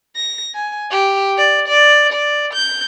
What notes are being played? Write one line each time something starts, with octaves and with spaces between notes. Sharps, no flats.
A#6
G#5
G4
D5
D5
D5
G6